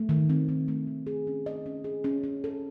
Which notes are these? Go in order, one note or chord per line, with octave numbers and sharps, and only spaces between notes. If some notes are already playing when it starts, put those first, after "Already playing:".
Already playing: A3
D#3
C4
D#3
A3
D#3
G#4
C#4
D#5
C#4
G#4
C#4
C#4
A4